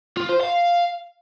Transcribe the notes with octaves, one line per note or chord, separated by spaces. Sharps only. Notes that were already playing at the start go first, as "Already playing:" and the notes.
F4
C5
F5